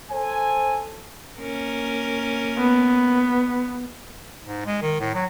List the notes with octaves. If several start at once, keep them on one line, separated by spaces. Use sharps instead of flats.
A4 C5 G#5
A#3 C#4 A#4
B3
G#2
G#3
D#3
A2
F#3